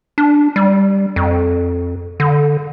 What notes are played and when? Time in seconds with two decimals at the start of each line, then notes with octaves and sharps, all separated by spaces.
0.18 D4
0.56 G3
1.16 F2
2.20 D3